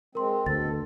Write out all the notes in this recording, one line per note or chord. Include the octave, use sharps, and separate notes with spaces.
G#3 C4 A#4 C6
D2 B2 A4 A6